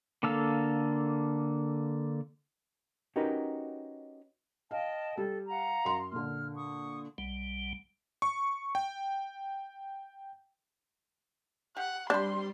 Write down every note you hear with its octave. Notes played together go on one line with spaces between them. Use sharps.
D3 A#3 A4 F5 E6
C#4 D#4 F#4 G4 A#4 B4
D#5 F5 G5 A5
G3 A4
F5 F#5 A#5
F#2 C6
A#2 D3 F6
C#6 D#6
B1 G3
C#6
G5
G4 F#5
G3 C4 D4 B5 C6